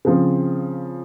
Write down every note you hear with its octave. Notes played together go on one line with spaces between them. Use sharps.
C#3 F3 C4